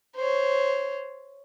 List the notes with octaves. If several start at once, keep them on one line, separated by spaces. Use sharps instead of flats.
C5 C#5